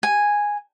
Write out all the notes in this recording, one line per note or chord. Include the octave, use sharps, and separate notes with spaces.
G#5